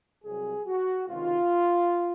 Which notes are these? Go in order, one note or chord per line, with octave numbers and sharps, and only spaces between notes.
C2 C3 F#3 G#4
F#4
C#2 C3 D#3 F4